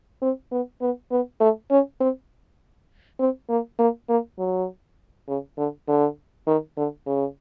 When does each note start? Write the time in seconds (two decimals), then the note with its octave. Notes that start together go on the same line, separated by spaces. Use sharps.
0.22 C4
0.52 B3
0.81 B3
1.11 B3
1.40 A3
1.71 C#4
2.00 C4
3.19 C4
3.49 A#3
3.79 A#3
4.09 A#3
4.38 F#3
5.28 C#3
5.58 D3
5.88 D3
6.47 D#3
6.77 D3
7.07 C#3